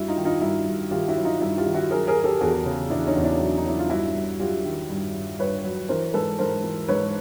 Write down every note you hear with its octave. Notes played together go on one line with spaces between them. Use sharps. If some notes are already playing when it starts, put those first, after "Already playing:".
Already playing: G2 E4 F#4
D#4 F4
D#3
D#4 F4
G2 E4 F#4
G2
D#3 F4 G4
E4 F#4
F#3
D#4 F4
G2 E4 F#4
F4 G4
D#3
E4 F#4
F#3 G#4 A#4
G#4 A#4
F#3
G4 A4
E2 F#4 G#4
C#3
E2 D4 E4
C#4 D#4
E2
D4 E4
F#3
D#4
F#3 E4
F4
G2 E4 F#4
G2
F#3 F4 G4
D#3
G2
G2
G2 B4 C#5
F#3
E3 A#4 C5
G#2 A4 B4
G#2 A#4 C5
E3
G#2 B4 C#5